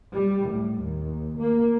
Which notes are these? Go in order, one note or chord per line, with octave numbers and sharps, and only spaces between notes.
G3
A2
D#2
A#3